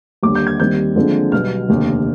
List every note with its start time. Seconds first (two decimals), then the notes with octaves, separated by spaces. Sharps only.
0.23 D#2 D3 G3 D6
0.35 G6
0.47 G#6
0.60 D#2 D#3 G3 C4 G6
0.96 D#2 D3 F3 G#3 C4
1.32 B1 B2 G3 B3 F6
1.68 F1 D#2 D3